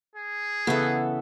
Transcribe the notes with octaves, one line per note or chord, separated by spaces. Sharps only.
G#4
C#3 E3 B3 E4 A4